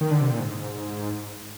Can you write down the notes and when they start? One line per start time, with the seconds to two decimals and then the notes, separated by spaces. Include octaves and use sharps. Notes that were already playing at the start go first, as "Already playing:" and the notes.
0.01 D#3
0.11 D3
0.21 C3
0.31 A#2
0.39 G#2